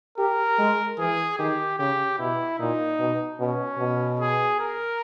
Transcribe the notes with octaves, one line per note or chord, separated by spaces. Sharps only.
G4 A#4
G#3
E3 G#4
D#3 G4
C#3 G4
B2 E4
A#2 D#4
B2
B2 C#4
B2
G#4
A#4